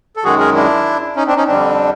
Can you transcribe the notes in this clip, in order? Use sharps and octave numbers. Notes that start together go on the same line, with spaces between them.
A4
F#2 D#3 G#3 F#4 G#4
G#4 A#4
D4 E4
C#4 D#4
C4 D4
C#4 D#4
F2 D3 G3 C4 D4